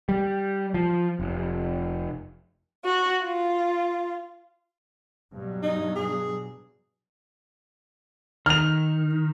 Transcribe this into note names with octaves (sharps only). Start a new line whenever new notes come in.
G3
F3
F1
F#4
F4
G2 B2 F#3
D#4
G#4
D#3 F6 F7